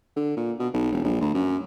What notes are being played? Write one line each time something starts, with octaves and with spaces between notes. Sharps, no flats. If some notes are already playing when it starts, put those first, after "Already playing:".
D3
A#2
B2
B1
E1
A#1
D2
F#2